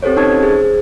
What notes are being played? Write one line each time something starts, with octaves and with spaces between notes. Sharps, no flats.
C4 G4 A4 C5 C#5
C#4 D#4 A5 C#6 G#6
G#4 C5